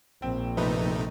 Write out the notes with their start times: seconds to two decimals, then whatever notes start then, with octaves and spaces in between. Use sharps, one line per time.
0.22 A#1 C4
0.57 F2 C3 A3 D#4 B4